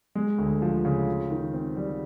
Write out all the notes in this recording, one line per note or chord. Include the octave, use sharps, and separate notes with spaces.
G#3
D2
F3
C#3
F4
D#3
C4
G3